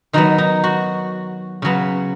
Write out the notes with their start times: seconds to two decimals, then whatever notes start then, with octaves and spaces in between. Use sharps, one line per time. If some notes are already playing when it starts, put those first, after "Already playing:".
0.13 D#3 F#3 B3 D#4
0.38 D#4
0.64 F#4
1.62 C#3 F#3 B3